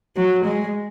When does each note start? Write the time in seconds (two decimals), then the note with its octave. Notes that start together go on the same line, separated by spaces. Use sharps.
0.16 F#3
0.45 G#3